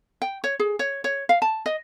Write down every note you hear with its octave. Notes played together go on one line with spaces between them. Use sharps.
G5
C#5
G#4
C#5
C#5
F5
A5
D#5